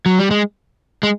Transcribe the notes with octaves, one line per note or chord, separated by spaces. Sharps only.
F#3
G3
G#3
G#3